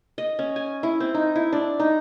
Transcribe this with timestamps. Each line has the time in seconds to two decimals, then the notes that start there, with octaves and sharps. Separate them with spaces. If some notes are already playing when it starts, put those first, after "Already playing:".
0.18 D#5
0.39 C#4
0.56 G#5
0.83 E4
1.00 C4
1.14 D#4
1.36 E4
1.53 D4
1.79 D#4